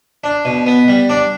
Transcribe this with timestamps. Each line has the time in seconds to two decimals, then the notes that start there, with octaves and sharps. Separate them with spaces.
0.24 D4
0.45 B2
0.67 B3
0.88 G3
1.09 D4 D5